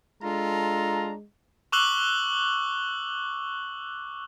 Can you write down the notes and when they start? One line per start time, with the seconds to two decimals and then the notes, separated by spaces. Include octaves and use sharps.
0.22 G#3 D4 F4 A4 A#5
1.72 C#6 D6 E6 F#6 F#7 G7